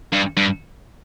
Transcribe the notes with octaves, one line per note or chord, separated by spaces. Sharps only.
G2
G2